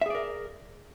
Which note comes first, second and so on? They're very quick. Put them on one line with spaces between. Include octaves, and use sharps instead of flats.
E5 G#4 D5 A#4